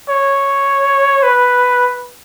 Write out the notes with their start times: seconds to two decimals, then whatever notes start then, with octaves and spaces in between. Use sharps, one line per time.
0.09 C#5
1.23 B4